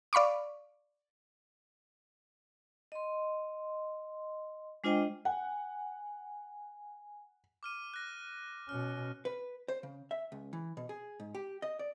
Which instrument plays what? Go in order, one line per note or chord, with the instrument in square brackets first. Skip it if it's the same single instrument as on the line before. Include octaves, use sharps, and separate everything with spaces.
[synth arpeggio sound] D5 F5 B5 C#6 D6
[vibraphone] D#5 C6
G#3 D4 F4 C5 D#5 G5
[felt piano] F#5 [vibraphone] G#5
[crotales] D6 F6 D#7
F#6 A#6
[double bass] B2 C#4 [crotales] F6
[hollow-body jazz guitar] B4
C5
C#3
E5
C#2
E3
B2
G#4
G#2
G4
D#5
D5